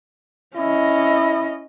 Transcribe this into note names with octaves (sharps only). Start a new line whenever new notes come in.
C#4 E4 D#5